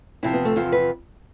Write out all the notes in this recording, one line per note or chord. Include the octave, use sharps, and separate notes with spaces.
E2 C3 F3 E4
B3
A3
E2 C3 F3 F4
B4